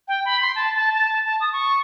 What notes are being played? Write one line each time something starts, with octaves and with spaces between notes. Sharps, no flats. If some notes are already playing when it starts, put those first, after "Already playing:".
G5
B5
C6
A5
A5
A5
A5
D#6
C#6